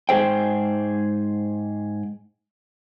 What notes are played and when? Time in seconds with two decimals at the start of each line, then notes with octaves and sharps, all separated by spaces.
0.09 G#2 G#4 C5 G5